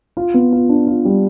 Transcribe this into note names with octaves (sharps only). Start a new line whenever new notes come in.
F4
B3
F4
D4
F4
G3